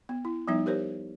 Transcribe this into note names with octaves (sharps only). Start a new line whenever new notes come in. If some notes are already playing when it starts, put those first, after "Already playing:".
B3
E4
F3 G3 B3 D#4 E5
G4 A#4 C5 C#5